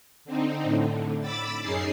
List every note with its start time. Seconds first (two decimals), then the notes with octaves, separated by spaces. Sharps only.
0.25 D3 C4 D#4
0.63 A2 D3
1.21 B5 D6 E6 A6
1.62 F#2 C#4 D#4 G#4 C7